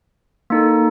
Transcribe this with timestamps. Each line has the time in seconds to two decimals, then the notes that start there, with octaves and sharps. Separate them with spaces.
0.50 A#3 D#4 A4